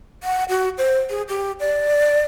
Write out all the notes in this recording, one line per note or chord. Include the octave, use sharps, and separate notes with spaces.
F#5
F#4
C5
G#4
G4
D5